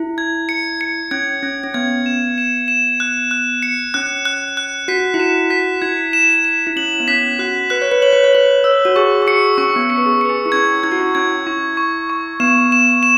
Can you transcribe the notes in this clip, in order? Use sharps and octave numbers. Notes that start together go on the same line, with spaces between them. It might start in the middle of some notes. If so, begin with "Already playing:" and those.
Already playing: E4
G#6
C#7
C#7
C#4 G#6
C#4 G#6
C#4
B3 G#6
E7
E7
E7
F#6
F#6
C#7
C#4 F#6
F#6
F#6
F#4 B6
E4
F#4 E7
F#4 B6
E4 G#6
E7
E7
E4
C#4 F#7
B3
C#4 B6
F#4 F#6
B4 F#6
C#5
B4
C#5 F#7
B4
C#5
B4 F#7
C#5 E6
F#4
G#4 C#6
G#4
F#4 C#7
C#4 C#6
B3
C#4
C#7
B4
G#4
B4 C#7
G#4
E4
C#4 G#6
E4 G#6
F#4
E4
C#4 G#6
E4 C#6
C#6
C#6
B3 E7
E7
E7